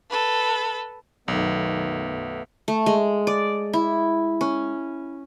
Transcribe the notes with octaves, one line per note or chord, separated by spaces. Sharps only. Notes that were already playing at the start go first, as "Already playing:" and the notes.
A4 B4
B1 F#2 D#3 A3 B3
A3
G#3
D5
E4
C#4